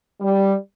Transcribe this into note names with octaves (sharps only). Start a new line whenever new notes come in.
G3